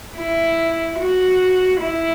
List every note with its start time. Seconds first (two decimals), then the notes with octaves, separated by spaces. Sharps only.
0.17 E4
0.99 F#4
1.82 E4